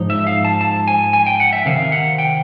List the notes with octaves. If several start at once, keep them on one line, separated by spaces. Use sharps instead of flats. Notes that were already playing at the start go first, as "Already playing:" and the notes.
Already playing: G#2 F3 D#4
E5
F5
A5
A5
G#5
G#5
G5
F#5
E5
C3 D#3 F5
F#5
G5